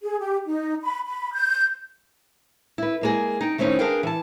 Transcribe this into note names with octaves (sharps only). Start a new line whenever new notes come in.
G#4
G4
D#4
B5
B5
G6
E4 B4
G#3 A#3 G#4
D#4 G5
D#3 A3 C4 C#4 D#4 E4
D4 G#4 A#4 B4 F5 G5
E3 A5